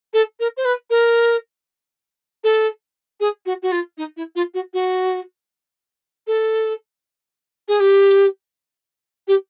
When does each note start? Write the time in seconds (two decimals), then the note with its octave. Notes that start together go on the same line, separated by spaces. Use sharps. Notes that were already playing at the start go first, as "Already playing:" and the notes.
0.14 A4
0.40 A#4
0.57 C5
0.65 B4
0.90 A#4
2.44 A4
3.20 G#4
3.46 F#4
3.63 F#4
3.72 F4
3.98 D#4
4.17 E4
4.36 F4
4.54 F#4
4.74 F#4
6.27 A4
7.68 G#4
7.80 G4
9.28 G4